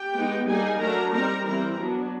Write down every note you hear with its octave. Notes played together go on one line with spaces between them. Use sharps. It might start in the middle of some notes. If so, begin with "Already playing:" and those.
Already playing: G4 G5
G#3 B3 D#4
G3 A#3 D#4 G#4 G#5
F#3 A3 D4 A#4 A#5
G3 C4 D#4 A#4 A#5
E3 G3 C4 E4 A#4 A#5
F#3 B3 D4